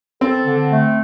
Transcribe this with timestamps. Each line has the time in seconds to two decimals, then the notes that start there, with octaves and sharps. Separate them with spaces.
0.21 C4 A4
0.46 D3
0.71 A3